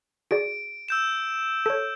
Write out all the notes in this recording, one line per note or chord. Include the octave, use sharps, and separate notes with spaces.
F#4 G#4 D5 D7
E6 G6 E7
A4 C#5